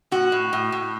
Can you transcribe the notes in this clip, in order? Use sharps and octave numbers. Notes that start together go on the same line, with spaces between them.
A2 F#4
A2
A2
A2